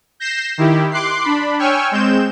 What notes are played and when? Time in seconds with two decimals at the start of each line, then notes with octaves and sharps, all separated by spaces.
0.20 G6 A#6 C7 E7
0.58 D#3 E4 G4
0.91 C6 D6 F#6 C7
1.24 D4 B5
1.59 C#5 G5 G#5 C#6 E6 F6
1.91 G#3 C4 G6 E7